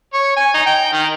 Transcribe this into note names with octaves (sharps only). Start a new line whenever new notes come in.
C#5
G#5
D#4
G5
D#3